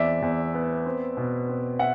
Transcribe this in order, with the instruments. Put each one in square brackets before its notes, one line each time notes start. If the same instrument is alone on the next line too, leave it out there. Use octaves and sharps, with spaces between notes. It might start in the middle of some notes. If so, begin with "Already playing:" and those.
Already playing: [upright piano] E2 C4 D5 E5
E2
B3
C4
B2
C4
E5 F#5